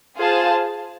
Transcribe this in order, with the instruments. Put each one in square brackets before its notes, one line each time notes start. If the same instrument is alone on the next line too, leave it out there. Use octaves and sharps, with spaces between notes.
[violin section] F4 G#4 C5 F5 A5